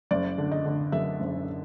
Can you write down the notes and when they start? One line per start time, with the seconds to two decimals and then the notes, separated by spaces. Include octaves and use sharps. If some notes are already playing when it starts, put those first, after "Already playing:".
0.11 F#1 D5
0.38 D3
0.52 D#5
0.65 D3
0.92 F#2 E5
1.20 F#1